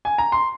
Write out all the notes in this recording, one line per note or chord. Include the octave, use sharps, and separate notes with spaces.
G#5
A#5
C6